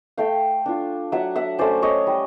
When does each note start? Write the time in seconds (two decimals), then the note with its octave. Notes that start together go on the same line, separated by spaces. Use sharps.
0.18 A3 F5 G5
0.66 D4 F4
1.12 F#3 E5 F#5
1.36 E5 F#5
1.59 A3 C#4 C5 D5
1.82 C#5 D#5
2.07 G3